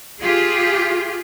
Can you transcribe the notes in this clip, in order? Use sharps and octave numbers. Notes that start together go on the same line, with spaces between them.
F4 G4 G#4